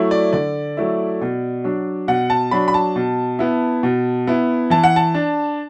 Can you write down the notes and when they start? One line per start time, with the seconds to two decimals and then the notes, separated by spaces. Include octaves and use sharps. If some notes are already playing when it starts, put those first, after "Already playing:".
Already playing: F#3 A3 E4
0.11 D5
0.33 D3 D5
0.77 F#3 A3 E4
1.21 B2
1.64 F#3 D4
2.08 B2 F#5
2.30 A5
2.51 F#3 D4 B5
2.68 B5
2.74 A5
2.96 B2
3.39 B3 E4
3.83 B2
4.27 B3 E4
4.70 E3 A5
4.84 F#5
4.96 A5
5.14 D4